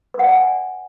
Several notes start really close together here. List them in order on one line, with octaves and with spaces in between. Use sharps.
B4 F#5 D5 G#5